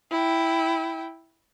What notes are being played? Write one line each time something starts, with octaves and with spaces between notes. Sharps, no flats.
E4 G5